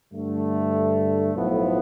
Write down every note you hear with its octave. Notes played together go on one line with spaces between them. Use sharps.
G2 D3 A3
B1 A2 F3 B3